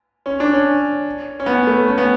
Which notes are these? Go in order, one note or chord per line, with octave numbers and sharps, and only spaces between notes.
C#4
D4
C#4
C#4
B3
A3
C#4
B3